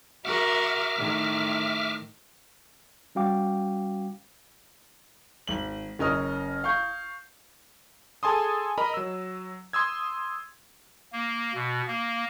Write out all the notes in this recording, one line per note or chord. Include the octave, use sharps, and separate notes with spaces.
F#4 A#4 E5 D6 F6
A2 D#3
G3 C#4 F#4 F5 G5 D6
G#1 F#7
F#1 C#4 A#4 D#5 D#6 F6
F5 C#6 G6
G#4 A4 G#5 A5 C6 D#6
A#4 D#5 A#5 B5
F#3 E6
C6 D#6 E6 G#6
A#3
B2
A#3